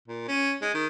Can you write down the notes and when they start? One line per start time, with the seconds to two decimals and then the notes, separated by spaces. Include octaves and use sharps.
0.08 A#2
0.28 C#4
0.62 G#3
0.74 D#3